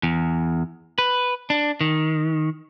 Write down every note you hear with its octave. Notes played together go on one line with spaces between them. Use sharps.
E2
B4
D4
D#3